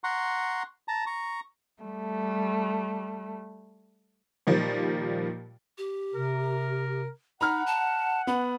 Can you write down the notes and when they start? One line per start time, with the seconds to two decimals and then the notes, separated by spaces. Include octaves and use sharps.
0.04 F#5 A#5 C6 C#6
0.88 A5 A#5
1.07 A#5 C#6
1.83 G3 A3
4.47 A#2 D#3 F3 G3 A#3
5.78 G4
6.14 C3 A#4
7.41 D#4 F#5 A#5 B5 F6
7.66 A5
8.27 B3 B5